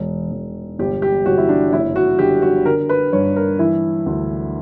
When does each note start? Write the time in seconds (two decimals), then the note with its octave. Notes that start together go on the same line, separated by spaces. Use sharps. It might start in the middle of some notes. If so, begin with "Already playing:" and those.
Already playing: E1
0.32 E1
0.79 G1 G4
1.02 G4
1.26 G1 F#4
1.37 E4
1.49 D4
1.72 F#1 E4
1.96 F#4
2.19 D3 G4
2.42 F#4
2.66 D3 A#4
2.89 B4
3.13 G2 C#5
3.36 A#4
3.59 E3 E4
4.06 D2